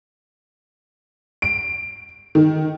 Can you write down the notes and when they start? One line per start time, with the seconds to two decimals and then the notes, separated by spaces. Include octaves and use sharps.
1.42 D7
2.35 D#3